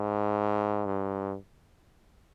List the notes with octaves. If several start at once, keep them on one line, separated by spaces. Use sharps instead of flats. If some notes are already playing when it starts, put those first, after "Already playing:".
Already playing: G#2
G2